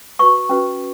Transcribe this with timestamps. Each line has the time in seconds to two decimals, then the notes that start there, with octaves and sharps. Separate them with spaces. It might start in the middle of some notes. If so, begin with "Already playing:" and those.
0.19 F#4 B4 C#6
0.49 C#4 F#4 B4